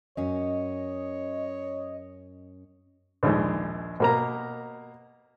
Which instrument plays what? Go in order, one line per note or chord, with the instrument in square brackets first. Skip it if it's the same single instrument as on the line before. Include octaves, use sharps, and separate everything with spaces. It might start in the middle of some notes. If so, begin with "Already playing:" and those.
[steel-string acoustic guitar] F#2 C#4 [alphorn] C#5 [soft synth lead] D#5
[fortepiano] A#1 D#2 G#3
B2 A#3 A#5